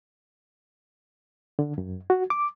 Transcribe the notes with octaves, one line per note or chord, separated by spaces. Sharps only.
D3
F#2
F#4
D6